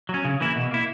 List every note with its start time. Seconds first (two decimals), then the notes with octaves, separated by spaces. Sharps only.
0.09 F#3 C#4
0.25 C#3
0.40 E3 A#3 E4
0.56 B2
0.71 A#3 E4